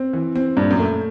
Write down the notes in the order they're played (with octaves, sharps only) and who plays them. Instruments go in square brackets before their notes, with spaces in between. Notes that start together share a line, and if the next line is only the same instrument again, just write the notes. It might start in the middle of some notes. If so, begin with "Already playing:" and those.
Already playing: [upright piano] C4
E3
C4
[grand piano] G2 [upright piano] A#2
[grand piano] F#2
[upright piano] A3